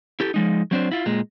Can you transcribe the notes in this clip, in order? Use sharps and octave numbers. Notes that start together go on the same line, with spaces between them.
E4 G4 A4
F3 G#3 D#4
F#3 C4 D4 C5
E4 F4
A#2 G#3